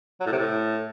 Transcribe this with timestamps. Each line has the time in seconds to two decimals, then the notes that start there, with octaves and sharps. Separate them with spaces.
0.21 F#3
0.26 A2
0.32 C3
0.38 A2